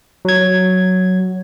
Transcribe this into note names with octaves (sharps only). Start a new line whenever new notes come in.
F#3 G#6